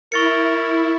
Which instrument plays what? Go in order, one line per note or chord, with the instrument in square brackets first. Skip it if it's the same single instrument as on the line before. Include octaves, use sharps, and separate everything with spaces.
[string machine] E4 [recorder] A#4 [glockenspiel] C#6 A6 C#7